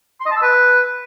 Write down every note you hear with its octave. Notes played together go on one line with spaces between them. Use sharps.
C6
D#5
A5
E6
B4